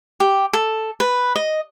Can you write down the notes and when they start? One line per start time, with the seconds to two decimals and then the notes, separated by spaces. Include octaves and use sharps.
0.20 G4
0.53 A4
1.00 B4
1.36 D#5